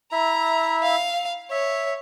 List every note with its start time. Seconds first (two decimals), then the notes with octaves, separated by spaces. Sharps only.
0.12 E4 E5 A#5
0.83 F5
1.51 C#5 E5